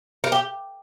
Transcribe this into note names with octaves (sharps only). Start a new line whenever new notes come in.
A#4
G4